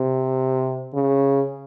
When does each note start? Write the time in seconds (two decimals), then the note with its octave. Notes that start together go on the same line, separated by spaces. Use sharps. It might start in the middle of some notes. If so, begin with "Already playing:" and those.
Already playing: C3
0.94 C#3